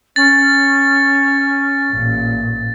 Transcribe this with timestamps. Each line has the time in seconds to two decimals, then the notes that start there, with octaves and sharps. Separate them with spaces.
0.16 C#4 A6
1.93 A1 A#2